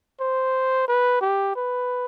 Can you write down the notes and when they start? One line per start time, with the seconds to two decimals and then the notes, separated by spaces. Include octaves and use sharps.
0.20 C5
0.88 B4
1.21 G4
1.56 B4